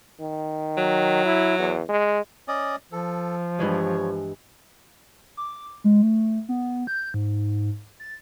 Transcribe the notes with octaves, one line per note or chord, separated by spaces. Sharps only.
D#3
F#3
E4
E2
G#3
C#4 D5 D#5
F3 A4
G2 E3 G#3 C#5
D6
G#3
A3
B3
G6
G#2
A6